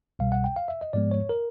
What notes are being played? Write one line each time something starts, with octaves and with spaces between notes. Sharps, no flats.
C2 B2 G3 F5
F#5
G5
F5
E5
D#5
G#2 F3 G#3 B3 D5
C#5
A#4